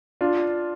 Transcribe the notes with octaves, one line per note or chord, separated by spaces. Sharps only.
D4 F4